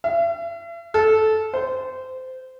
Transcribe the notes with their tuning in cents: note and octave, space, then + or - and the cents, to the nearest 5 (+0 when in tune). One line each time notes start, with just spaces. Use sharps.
E5 +45
A4 -15
C5 -20